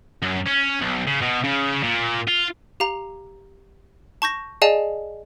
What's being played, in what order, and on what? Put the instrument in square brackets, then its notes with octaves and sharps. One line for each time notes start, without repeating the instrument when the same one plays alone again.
[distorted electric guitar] F#2
C#4
B1
C#3
B2
C#3
A#2
F4
[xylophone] G4 F5 A#5
A5 C#6 G6 A#6
G#4 D5 D#5 F5 G#5 A5